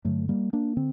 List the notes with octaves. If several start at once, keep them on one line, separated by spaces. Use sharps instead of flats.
G2 D3 F#3 A3
G3 A#3
A#3 D4
D3 C4